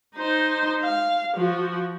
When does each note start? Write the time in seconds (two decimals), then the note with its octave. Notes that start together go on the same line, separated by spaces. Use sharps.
0.15 D#4 C5
0.82 F5
1.36 F3 F#4